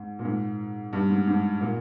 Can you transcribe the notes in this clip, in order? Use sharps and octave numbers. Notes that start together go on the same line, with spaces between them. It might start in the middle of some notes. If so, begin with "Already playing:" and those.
Already playing: G#2
A#2
G#2
G2
G#2
G#2
A#2